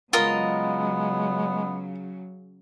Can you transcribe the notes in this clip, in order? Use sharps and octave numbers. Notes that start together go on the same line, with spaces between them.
C#3 F#3 G#3 B3 F4 A#4 D#5